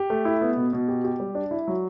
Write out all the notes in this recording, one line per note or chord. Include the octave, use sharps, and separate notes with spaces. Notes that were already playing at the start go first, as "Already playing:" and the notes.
Already playing: G4
A3
E4
B3
B2
B2
G4
G4
G3
D4
E4
F#3